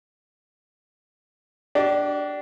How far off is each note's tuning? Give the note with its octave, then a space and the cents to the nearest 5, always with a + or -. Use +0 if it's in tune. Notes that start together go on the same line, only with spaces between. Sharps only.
D4 +0 G4 -40